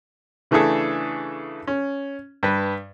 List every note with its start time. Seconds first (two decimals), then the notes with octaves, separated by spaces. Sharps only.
0.51 C#3 E3 A3 D4 G#4 A4
1.68 C#4
2.43 G2 B4